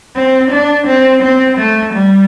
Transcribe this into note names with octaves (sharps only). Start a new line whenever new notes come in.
C4
D4
C4
C4
A3
G3